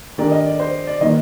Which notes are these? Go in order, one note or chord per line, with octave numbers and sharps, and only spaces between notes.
D#3 A3 D4 G4 A#4 D5
D#5
D5
C5
D5
D#3 G3 A#3 D#4 D#5